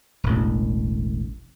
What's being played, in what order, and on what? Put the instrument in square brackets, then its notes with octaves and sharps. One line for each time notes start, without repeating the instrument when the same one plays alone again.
[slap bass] E1 A1